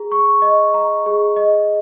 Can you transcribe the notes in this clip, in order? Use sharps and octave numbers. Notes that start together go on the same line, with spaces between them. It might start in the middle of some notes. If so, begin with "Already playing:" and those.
Already playing: G#4 A#5
C#6
D#5
A#5
G#4
D#5